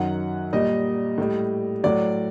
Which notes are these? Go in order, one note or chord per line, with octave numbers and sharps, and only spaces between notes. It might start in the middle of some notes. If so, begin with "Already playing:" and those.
Already playing: F#2 D#3 F#3 F#5
A#2 G3 D#5
A2 G3
A2 F#3 D5